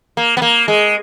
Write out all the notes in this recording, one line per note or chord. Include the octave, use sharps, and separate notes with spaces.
A#3
B3
A#3
G#3